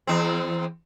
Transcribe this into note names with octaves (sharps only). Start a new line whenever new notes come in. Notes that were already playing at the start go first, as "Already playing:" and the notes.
E2 C4